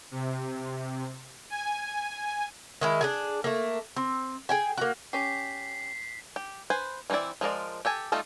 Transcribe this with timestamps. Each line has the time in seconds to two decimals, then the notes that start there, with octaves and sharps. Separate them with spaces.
0.11 C3
1.50 G#5
2.81 D#3 G#3 E4
3.01 D4 G#4 G#5
3.44 A3 A#3
3.96 C4
4.49 G#4 G5 G#5
4.78 A#3 F#4
5.13 C#4 G4 B6 C7
6.36 G4
6.70 B4 C5 G#5
7.10 E3 A#3 C4 E4 D5
7.41 F3 G#3 A#4 D5
7.85 G4 A4 G#5
8.12 G3 A3 D#4 F4 A4